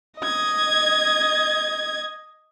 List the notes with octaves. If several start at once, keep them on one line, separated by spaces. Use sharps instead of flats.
D#5 G#6